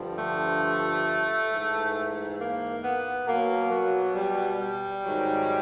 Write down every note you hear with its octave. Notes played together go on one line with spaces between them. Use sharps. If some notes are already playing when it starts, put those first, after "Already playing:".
Already playing: G2 D3 F3
A3
G#2 E3
A#3
B3
B2 F#3 A#3
F#3
G3
G3
G#2 D#3 F#3